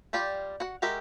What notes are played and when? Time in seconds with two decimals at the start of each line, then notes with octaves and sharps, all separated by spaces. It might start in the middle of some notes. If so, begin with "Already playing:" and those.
0.13 G3 F4 G4 D5
0.60 F#4 F#5
0.82 G#3 F#4 G4 A#4 E5